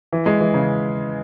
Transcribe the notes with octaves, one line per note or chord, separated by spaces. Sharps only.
E3
G#3
E3
C#3